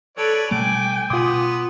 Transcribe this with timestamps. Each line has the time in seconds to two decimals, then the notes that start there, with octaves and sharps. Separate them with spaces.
0.18 A4 B4 C#5 D5
0.51 B2 G3 A3 G5 G#5 D6
1.10 B2 B3 F4 C6 D6 D#6